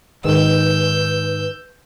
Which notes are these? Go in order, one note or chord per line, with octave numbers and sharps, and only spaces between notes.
G#2 D#3 B4 E6 G6